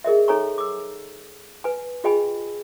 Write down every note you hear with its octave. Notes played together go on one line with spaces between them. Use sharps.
G#4 A#4 D#5 E5
D#4 A4 C#5 G#5 A#5 C#6
D6 E6
B4 G#5
F4 G#4 D#5 G5 G#5 B5